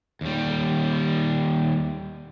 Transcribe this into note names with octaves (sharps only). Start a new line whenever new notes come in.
D#2 G3